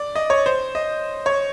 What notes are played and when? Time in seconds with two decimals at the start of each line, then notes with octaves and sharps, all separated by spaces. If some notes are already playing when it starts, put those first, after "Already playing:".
Already playing: D5
0.15 D#5
0.30 C#5
0.46 C5
0.75 D#5
1.26 C#5